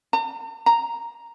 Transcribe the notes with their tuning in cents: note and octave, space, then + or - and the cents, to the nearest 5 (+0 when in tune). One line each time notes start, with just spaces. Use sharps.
A#5 -45
A#5 -5